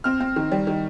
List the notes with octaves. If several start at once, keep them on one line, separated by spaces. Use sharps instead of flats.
C4 F6
C4
D#3
G3
D#3